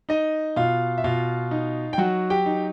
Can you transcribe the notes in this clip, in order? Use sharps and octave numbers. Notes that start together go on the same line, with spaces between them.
D#4 D#5
B2 F4 F5
E5
B2 F4 F5
D#4
G5
F#3 F#4 F#5
G4 G5
D#4